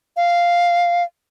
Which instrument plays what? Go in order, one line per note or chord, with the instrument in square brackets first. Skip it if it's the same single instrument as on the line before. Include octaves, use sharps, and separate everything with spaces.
[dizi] F5